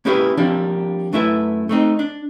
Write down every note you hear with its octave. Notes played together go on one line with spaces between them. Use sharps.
A#3 C#4 E4 G4 G#4 B4
F3 G3 A#3 C4 D4
F#2 A3 E4 B4 E5
A3 C4 D#4
D4